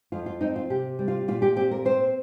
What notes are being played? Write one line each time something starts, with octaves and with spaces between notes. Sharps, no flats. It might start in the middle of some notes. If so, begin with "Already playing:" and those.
F2 F4
F4
C4 D#4
F4
C3 G4
G3
F4
A#2 F4
G4
C4 G4
A#4
C4 C5